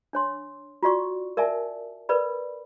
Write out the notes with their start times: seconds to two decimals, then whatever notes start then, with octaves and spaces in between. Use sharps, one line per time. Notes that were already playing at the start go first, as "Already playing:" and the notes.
0.13 D4 C#5 C6
0.83 F4 F#4 D5 C#6
1.37 A#4 D5 E5 G#5 A5
2.09 A#4 B4 D5 B5